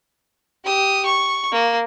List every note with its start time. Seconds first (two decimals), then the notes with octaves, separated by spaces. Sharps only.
0.65 G4 D#6
1.06 C#6
1.52 A#3